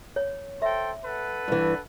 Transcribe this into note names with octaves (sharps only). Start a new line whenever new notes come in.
C#5
A4 C5 E5 G5
A4 B4 F#5
G2 E3